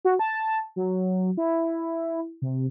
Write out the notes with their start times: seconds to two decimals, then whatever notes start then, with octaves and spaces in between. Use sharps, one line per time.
0.05 F#4
0.19 A5
0.76 F#3
1.37 E4
2.42 C3